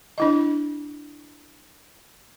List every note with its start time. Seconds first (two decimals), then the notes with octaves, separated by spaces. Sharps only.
0.18 D4 E4 D#5